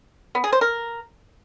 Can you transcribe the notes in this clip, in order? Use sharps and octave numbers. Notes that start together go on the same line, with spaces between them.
B3
G#4
C5
A#4